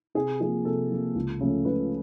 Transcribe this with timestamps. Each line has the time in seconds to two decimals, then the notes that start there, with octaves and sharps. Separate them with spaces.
0.15 C3 G#4
0.40 F3 A#3 G#4
0.65 C3 A4
0.91 F3 A#3
1.15 C#2
1.41 C#3 F3 A3 C#4
1.65 C#2 B4